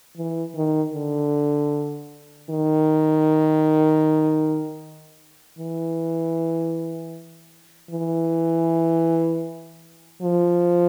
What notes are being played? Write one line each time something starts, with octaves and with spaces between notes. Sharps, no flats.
E3
D#3
D3
D#3
E3
E3
F3